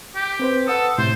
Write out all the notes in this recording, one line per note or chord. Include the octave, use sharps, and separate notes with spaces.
G4
C4 B4 C5
A4 B4 F#5 D#6
A2 C3 A3 C5